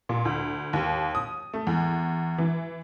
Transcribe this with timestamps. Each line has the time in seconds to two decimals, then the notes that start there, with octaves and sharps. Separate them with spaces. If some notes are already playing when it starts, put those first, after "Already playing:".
0.09 A#2
0.25 D2
0.73 D#2
1.15 D#6
1.54 A3
1.67 E2
2.38 E3